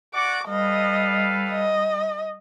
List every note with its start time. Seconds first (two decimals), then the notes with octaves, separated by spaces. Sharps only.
0.15 F#4 D5 F#5 D6
0.48 G3 A4 B4 D#5 F5
1.51 D#5